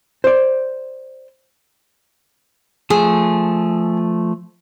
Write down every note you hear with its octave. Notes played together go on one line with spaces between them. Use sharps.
C5 D5
F3 A3 G#4